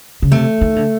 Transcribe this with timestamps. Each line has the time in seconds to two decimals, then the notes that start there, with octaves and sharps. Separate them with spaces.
0.22 C#3
0.31 C3 A3
0.61 D#3
0.76 D3